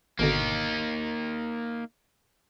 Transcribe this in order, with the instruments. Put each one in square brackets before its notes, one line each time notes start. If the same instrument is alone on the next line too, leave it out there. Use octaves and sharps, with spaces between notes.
[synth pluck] G#1 B2 D3 [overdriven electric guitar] A#3 D#4